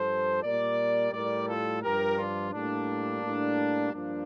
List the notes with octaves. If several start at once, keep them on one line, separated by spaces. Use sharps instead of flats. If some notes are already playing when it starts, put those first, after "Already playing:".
Already playing: G2 F3 A4 C5
A#2 G3 A#4 D5
A2 G3 A#4 D5
F4 A4
G2 F3 G4 A#4
D4 F4
A2 G3 A#3 D4
A2 G3
G2 F3 A#3 D4